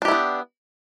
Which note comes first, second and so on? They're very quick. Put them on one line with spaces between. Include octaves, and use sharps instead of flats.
D4 G4 E4 B3